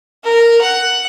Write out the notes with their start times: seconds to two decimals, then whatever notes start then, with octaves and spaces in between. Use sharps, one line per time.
0.24 A#4
0.61 F#5